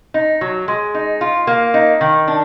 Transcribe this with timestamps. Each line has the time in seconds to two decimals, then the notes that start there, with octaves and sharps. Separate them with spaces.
0.14 D#4
0.41 F#3
0.68 G#3
0.95 D#4
1.21 F4
1.47 A#3
1.74 D#4
2.01 D#3
2.28 D4